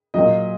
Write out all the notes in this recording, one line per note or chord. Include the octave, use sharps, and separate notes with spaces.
A#2 F#3 D#5